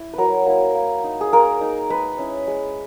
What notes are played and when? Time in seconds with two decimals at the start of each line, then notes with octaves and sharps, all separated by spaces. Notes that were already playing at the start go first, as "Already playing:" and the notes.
Already playing: E4
0.14 F#3 A#4 B4
0.46 A#3 E4
0.75 A#3
1.04 D#4
1.21 G#4
1.33 A#3 A#4
1.61 D#4
1.90 G#3 B4
2.18 C#4 E4
2.48 G#3